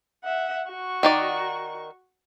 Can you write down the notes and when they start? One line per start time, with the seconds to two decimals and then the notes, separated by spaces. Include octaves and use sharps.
0.24 E5 F#5
0.67 F#4 C#6
1.03 D#3 D#4 D5